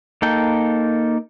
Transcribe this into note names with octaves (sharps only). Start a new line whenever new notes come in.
A#3 D#4 A4 G5